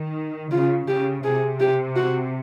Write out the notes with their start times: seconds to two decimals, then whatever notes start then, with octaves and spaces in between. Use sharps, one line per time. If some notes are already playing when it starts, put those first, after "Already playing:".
Already playing: D#3
0.52 C#3 F4
0.88 C#3 G4
1.24 C3 G#4
1.60 G4
1.96 F#4